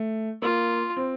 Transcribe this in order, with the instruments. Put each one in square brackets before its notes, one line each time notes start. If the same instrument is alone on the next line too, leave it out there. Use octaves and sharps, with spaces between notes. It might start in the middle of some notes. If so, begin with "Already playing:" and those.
Already playing: [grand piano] A3
[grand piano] A#3 [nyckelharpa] F4
[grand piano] C4